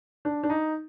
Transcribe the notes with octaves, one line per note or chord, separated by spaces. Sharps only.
D4
D4
D#4